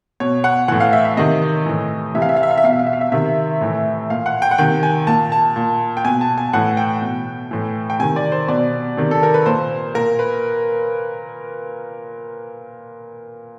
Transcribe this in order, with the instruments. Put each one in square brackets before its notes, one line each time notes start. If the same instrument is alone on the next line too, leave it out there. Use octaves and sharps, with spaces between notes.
[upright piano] B2 C#5
F#5
A2 E3 F#5
F5
E5
E5
C3 D#3 D#5
A2 E3
C3 E3 E5
F5
E5
F5
E5
F5
E5
B2 F5
E5
F5
E5
F5
E5
C3 D#3 E5
A2 E3
A#2 F5
F#5
G5
F#5
C3 D#3 G5
G#5
A#2 A5
A5
A#2
G5
B2 G#5
A5
G#5
A2 E3 F#5
G5
B2
A2 E3
G5
C3 D#3 G#5
D5
C5
B2 D5
C3 D#3
A4
A#4
B4
A#2 C5
A#2 A#4
B4